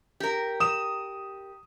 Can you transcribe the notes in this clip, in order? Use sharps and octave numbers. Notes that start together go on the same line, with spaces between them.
G4 A#4
D#6 E7